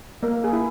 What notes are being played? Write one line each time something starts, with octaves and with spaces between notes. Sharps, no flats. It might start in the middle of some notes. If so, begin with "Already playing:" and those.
A#3 A#4
G#4
E4